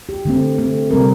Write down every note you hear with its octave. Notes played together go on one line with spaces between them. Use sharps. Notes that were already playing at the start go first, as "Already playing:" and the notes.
G4
D3 A3 C4
D3 A3 C4
C3 G3 C4 A#4